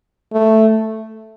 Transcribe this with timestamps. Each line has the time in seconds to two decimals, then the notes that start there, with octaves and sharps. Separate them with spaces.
0.33 A3